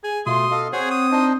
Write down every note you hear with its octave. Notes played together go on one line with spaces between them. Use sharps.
G#4 G#5
B2 A3 F4 C6 D#6
A4 D#5 F5
C4 G#4 C5 C#5 F#5
D#6
D4 D#4 C5 D#5